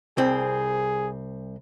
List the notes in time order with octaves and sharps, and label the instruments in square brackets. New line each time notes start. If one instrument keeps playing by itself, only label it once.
[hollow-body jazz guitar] C2 C4 [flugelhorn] G#4